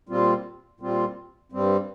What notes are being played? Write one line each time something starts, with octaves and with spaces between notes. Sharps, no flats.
A#2 G3 C4 F4
A#2 G3 C4 F4
G2 G3 C4